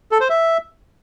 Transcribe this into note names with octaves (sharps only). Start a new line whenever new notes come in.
A4
C5
E5